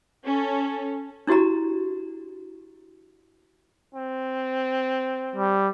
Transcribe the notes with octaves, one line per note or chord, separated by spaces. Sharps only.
C#4 A4
D4 E4 F#4 G4 A#5
C4
G3